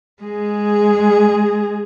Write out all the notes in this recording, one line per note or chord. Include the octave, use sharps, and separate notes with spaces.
G#3 G#4